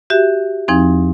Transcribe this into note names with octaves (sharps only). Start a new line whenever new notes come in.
F#4 G4 E5
E2 F3 C4 D#4